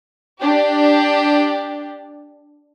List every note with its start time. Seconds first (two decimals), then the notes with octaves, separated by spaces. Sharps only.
0.39 D4 G4